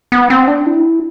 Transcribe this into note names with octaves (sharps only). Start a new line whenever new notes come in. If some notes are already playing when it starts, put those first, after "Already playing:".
B3
C4
D4
E4